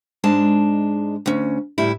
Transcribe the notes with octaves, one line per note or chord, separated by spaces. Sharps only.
G#2 G#3 D4 A5
D2 C#4
D2 A2 G3 E4